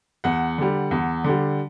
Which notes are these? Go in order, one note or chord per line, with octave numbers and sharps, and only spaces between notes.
E2 F#5
D3 G3
E2
D3 G3